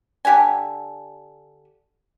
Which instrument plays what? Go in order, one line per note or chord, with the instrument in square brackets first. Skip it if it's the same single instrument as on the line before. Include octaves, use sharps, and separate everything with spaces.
[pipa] D3 G4 F#5 G#5